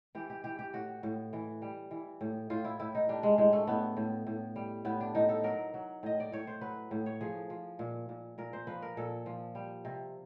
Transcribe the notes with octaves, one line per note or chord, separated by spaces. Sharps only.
E3 G4
G4
E3 G4
G4
A2 F#4
A2
E3
G3
E3
A2
A2 F4
E4
A2 E4
D#4
G3 D4
G#3
A2 G#3
A3
A2 B3
A2
A2
G3
A2 B3
D4
A2 D#4
A4
F#3 A#4
F#3
A2 D#5
D5
A2 C#5
C5
F#3 B4
A2
C#5
F3 G#4
F3
A#2
A#2
A#2 A#4
C5
F3 B4
A#4
A#2 A4
F3
G3
C3